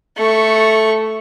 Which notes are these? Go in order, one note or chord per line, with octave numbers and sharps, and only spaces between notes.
A3 C#6